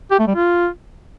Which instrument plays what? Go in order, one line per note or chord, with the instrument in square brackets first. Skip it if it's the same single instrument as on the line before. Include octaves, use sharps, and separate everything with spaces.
[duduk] G4
A3
G3
F4